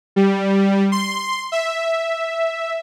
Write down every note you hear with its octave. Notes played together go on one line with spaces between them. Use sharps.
G3
C6
E5